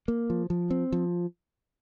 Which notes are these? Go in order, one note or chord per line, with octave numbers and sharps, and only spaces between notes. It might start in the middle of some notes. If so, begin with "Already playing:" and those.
A#3
F3
F3
C4
F3